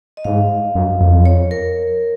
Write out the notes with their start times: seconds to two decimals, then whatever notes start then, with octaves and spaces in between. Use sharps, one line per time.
0.17 D#5
0.24 G#2 F5
0.75 F#2
1.01 F2
1.26 C#5
1.51 A#4